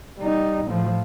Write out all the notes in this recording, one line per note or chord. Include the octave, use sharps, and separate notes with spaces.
G3 D#4
A2 F3